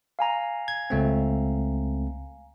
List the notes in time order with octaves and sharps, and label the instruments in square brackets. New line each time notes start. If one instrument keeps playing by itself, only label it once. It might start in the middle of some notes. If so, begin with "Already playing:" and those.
[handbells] F5 G#5 A#5
[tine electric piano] G#6
C#2 A3 C4